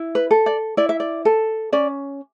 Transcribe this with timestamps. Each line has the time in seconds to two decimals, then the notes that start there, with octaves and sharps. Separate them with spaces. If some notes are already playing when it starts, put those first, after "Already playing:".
Already playing: E4
0.15 B4
0.31 A4
0.46 D5
0.77 E4 D5
0.89 E5
1.00 D5
1.25 A4
1.72 C#4 D5